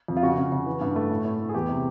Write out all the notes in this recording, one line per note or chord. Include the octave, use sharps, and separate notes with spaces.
F2
F4
C#3 F#4
C#3
C#3
E3
G2
A3
A2
A2
A2
G#4
E2 G4
C3